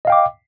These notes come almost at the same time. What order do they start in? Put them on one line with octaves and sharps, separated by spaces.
D#5 F5 G5 D6